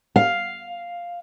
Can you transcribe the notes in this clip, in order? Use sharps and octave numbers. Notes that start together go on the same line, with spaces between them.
F5